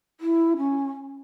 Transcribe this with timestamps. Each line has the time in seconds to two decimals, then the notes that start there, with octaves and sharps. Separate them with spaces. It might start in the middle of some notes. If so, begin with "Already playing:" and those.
0.20 E4
0.57 C#4